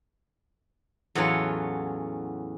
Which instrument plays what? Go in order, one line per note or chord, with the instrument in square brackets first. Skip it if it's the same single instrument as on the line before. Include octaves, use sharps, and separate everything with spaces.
[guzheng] E2 A2 F#3 C#4 F4 C#5